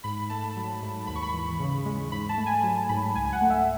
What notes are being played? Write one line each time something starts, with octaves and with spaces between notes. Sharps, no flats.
G#2 B5
A3 A5
F#3
G#2
D#2 B5
C#6
B5
E3
C#3
G#3
G#2 B5
A5
A3
G#5
F#3 A5
G#2 B5
C#2 G#5
G#5
F#5
A3
E5